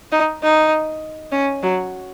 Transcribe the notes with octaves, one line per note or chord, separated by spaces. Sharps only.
D#4
D#4
C#4
F#3